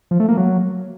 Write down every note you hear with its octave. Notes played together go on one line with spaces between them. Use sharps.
F3
A3
A#3
F#3